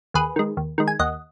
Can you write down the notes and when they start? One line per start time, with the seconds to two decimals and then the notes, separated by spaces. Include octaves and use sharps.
0.14 D#2 G#4 B4
0.36 D#3 G#3
0.57 D#2
0.78 D#3 G#3
0.88 G#5
0.99 D#2 D#5 F#5